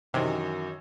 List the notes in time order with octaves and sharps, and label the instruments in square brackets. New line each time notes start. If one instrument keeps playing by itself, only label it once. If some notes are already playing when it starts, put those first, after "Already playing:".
[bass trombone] F#2 [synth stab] C3 [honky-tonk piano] D#3 E3 D#4